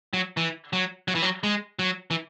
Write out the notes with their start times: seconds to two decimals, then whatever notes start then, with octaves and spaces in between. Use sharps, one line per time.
0.14 F#3
0.37 E3
0.73 F#3
1.08 F#3
1.15 E3
1.22 F#3
1.43 G#3
1.79 F#3
2.11 E3